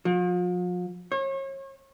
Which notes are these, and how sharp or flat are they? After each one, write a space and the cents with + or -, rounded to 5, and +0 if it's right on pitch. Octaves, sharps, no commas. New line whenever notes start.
F3 +40
C#5 -35